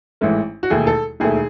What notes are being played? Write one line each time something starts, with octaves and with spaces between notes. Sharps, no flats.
A1 G#2 E3 A3
F#4
E1 D#2 D#3 A3 G#4
A4
E1 D#2 D#3 A3 G#4